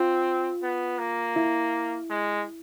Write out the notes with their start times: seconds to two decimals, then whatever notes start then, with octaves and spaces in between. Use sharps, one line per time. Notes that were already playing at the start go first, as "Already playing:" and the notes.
Already playing: C4 F4
0.62 B3
0.99 A#3
1.36 E4
2.10 G#3